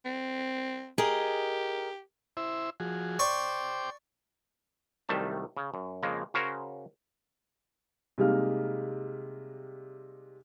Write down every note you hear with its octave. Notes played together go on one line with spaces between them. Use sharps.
C4
G4 G#4 A#4 D#5
E4 C5 E5
F3 F#4 G#4
C5 D5 G5 C#6 D6
C2 D#3 F#3 G3 A3 A5
C#3
F#2
F2 C#3 G#3 A#3
C#3 C#4 F#4 A#4 C5 C#5
C3 G3 G#3 A#3 D#4 F6